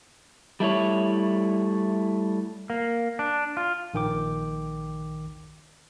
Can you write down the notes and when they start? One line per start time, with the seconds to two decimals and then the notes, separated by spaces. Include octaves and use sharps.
0.60 G3 A3 E4 C#5
2.70 A#3
3.19 D4
3.57 F4
3.94 A#1 D#3 G5 D6